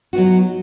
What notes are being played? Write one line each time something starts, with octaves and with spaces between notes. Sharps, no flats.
F#3 B3 D#4 F#4